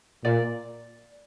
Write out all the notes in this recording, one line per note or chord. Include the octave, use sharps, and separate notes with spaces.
A#2 D5